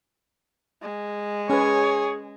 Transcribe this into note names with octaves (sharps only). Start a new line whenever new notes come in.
G#3
C#4 G#4 B4 C#5